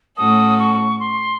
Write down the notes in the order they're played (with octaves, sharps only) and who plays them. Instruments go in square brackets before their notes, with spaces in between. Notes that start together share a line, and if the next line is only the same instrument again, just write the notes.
[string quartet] A2 A3 C#4 F#4 A4 [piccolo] D#6
[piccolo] C#6
C6